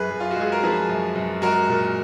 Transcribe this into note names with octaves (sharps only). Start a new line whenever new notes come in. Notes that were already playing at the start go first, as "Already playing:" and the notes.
Already playing: F#2 G#4 B4
F#2
F4
F#4
G#3 G#4
A#4
F3 G#4 B4
F#2
F#2
G#3 F#4 A#4
A#2